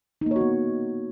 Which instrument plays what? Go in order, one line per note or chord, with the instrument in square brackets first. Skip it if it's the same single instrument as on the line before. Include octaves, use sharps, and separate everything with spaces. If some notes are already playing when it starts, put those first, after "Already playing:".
[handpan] D#4
A#3
C#5
F#4
B3